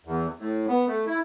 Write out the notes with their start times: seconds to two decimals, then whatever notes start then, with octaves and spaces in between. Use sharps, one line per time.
0.05 E2
0.39 A2
0.68 B3
0.87 A3
1.07 E4